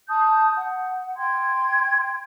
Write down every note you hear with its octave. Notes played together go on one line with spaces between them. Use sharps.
A5 D#6 G6
F#5
G5 C6 G#6